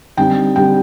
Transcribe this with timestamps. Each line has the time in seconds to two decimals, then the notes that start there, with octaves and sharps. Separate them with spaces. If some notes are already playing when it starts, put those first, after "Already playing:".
0.17 D3 G3 C4 D#4 G5
0.56 D3 G3 C4 D#4 G5